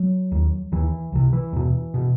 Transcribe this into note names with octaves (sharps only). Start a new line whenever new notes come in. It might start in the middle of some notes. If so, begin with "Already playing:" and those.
Already playing: F#3
D#2
D#2 E3
C2 C3
E3
E2 B2
B2